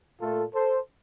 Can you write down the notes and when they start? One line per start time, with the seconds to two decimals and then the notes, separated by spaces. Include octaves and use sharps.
0.20 A#2 A3 F4 A4
0.54 A4 C5